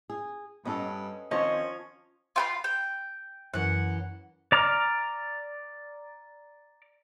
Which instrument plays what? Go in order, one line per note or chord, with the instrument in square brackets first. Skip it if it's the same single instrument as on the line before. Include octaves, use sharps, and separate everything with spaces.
[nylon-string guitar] G#4
[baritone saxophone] G2 [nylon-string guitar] B3 C#4 A4 [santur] D#5
[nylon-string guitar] D#3 C4 [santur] F3 C#5 C6 [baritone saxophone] C#4 [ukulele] D#5
[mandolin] F4 G5 B5
G5
[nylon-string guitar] F#2 E3 [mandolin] F#5
[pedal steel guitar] D5 A#5 D6 F6